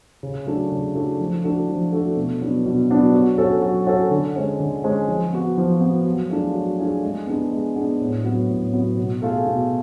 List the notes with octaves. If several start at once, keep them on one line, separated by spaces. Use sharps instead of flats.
C#3
F#3 A3 D4
C#3
F#3 A3 D4
F3
A3 D4 F#4 A4
F3
A3 D4 F#4 A4
B2
F#3 B3 D4
B2
F#3 B3 D4
F#3
C#4 F#4 A4
F#3
C#4 F#4 A4
D3
G#3 C#4
D3
G#3 C#4
F3
B3 F#4
F3
B3 F#4
F#3
A3 D4 F4 G#4
F#3
A3 D4 F4 G#4
G#3
B3 D4 G#4
G#3
B3 D4 G#4
A2
F#3 B3
A2
F#3 B3
B2
A3 F4 G#4
B2